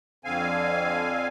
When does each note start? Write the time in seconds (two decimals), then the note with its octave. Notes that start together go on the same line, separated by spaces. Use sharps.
0.25 F2 D3 C4 F5 G#5